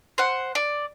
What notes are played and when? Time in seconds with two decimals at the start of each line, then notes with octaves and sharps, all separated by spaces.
0.18 C5 F#5
0.55 D5